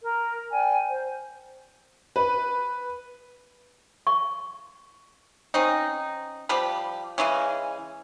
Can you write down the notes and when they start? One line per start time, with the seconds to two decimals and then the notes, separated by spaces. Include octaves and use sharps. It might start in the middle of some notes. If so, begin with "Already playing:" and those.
0.01 A#4
0.52 D5 G5 G#5
0.89 C5
2.16 B4
4.07 C#6
5.54 C4 C#4 D#4
6.49 F3 G3 G4 B5
7.18 C#3 E3 G#3 C#4